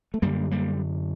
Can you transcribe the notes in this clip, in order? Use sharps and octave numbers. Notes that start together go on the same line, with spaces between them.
A3
F#2 D3 G3 A#3
G3 A#3